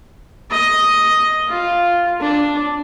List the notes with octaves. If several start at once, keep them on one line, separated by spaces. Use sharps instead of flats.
D#5
F4
D4